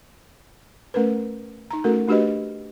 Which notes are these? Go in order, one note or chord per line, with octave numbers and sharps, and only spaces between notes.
A3 C#4 A#4 B4
D#4 A#5
A3 C#4 F#4 A4 A#4
A3 D4 F#4 G4 B4 D#5